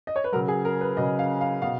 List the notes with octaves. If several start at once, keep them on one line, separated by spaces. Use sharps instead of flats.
D#5
C#5
B4
C#3 F#3 A#4
G#4
A#4
B4
C#3 F#3 D#5
F5
F5
B2 F5